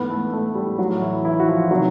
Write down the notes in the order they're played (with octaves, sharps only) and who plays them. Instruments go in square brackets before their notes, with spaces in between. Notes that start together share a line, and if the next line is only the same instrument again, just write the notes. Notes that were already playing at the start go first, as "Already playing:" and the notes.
Already playing: [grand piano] G#2 E3 A3 B3 B4
A3 A4
A3 A4
G3 G4
A2 F#3 A3 F#4
E3 E4
E3 E4
F#4
F3 F4
C3 D#3 F#3 F#4